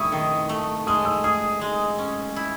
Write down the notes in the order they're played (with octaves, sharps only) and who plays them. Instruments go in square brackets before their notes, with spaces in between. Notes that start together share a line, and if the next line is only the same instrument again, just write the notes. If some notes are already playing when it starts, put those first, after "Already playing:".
Already playing: [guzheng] E4 [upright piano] C#6 D#6
[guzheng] D#3
A3
[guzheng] G#3 [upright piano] D#6
[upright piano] E6
[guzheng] G#4 [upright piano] D#6
[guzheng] G#3
C#4
E4